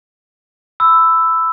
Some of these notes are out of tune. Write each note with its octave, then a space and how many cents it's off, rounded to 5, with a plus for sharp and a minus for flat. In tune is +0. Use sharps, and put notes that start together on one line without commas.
B5 +25 E6 +0